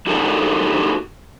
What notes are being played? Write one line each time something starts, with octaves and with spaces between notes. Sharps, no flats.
D4 D#4 F#4 G4 A4 A#4